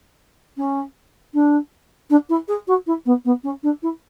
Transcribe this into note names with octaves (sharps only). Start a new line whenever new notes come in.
C#4
D4
D4
E4
G#4
F#4
E4
B3
B3
C#4
D4
E4